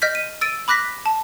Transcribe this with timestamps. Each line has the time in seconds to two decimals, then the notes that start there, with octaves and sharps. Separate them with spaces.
0.02 D#5 F6 G6 B6
0.15 D#7
0.41 E6 A6 D7 D#7
0.68 B5 D6 F#6 A#6 B6
1.06 A5